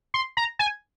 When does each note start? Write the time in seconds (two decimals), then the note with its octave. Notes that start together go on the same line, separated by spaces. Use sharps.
0.14 C6
0.37 A#5
0.59 G#5